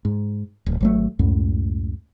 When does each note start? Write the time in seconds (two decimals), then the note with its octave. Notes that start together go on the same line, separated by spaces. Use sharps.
0.05 G#2
0.66 D1
0.81 G#1 F#3 A3
1.19 C#2 F#2 A2